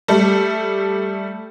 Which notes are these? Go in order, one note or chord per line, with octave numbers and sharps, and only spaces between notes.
G3 A3